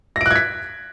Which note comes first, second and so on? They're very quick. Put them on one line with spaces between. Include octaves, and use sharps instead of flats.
A#6 D7 F#6 G#6 B6